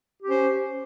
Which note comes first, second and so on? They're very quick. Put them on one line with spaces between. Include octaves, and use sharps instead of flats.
G4 C#4 C5